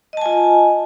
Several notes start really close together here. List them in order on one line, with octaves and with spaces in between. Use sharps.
D#5 A5 G#5 F4